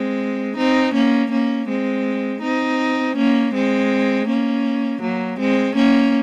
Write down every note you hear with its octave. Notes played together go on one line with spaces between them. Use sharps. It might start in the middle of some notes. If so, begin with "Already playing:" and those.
Already playing: G#3 C4
C4 D#4
A#3 C#4
A#3 C#4
G#3 C4
C4 D#4
A#3 C#4
G#3 C4
A#3 C#4
F#3 A#3
G#3 C4
A#3 C#4